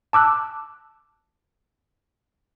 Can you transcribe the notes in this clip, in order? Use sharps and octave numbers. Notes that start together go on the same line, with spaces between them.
A5 D6 E6 F#6